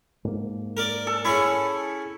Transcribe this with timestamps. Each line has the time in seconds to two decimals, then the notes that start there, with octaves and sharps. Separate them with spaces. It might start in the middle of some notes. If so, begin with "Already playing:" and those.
0.25 G#2 A#3
0.77 A#4 D5
1.07 A4
1.25 C#4 E4 G#4 C#6